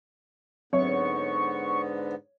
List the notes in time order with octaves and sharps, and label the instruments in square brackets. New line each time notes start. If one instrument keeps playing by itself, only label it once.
[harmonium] G#2 D3 B3 [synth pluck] F#3 C4 E5 [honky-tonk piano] C#5 [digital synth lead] C#6